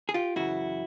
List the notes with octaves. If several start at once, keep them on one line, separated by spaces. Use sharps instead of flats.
G#4
F4 G4
F#2 C#3 E3 E4 F#4